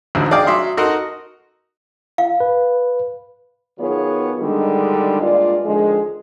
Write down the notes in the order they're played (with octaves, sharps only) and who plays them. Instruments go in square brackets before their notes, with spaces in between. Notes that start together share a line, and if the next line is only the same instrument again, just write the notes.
[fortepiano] A1 D2 G#2 D3 F#3
G#4 D5 D#5 F5 G5 D6
F#3 E5 C6 D#6
D#4 F#4 A4 A#4 D#5 C6
[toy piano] F5
[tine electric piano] B4
[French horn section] D#3 F#3 B3 F4 G#4 C#5
G2 D3 D#3 G3 G#3
G2 A#2 G#3 F4 D5
D3 D#3 F3 G#3